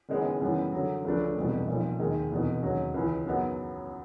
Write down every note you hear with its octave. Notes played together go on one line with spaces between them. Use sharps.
F#1 F#2 D#3 G#3 B3
F#2 C#3 E3 G3 B3
F#2 D3 F#3
C#2 C#3 F3 A3 D4
F1 E2 B2 G3
B1 A#2 F3
D#2 D#3 G#3
F1 E2 B2
D#2 C#3 F#3
C#2 C#3 E3
F#2 C#3 F#3 B3 D#4